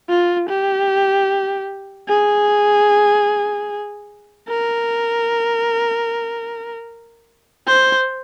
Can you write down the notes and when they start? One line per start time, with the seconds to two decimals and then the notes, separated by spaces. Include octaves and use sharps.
0.09 F4
0.49 G4
2.09 G#4
4.49 A#4
7.67 C5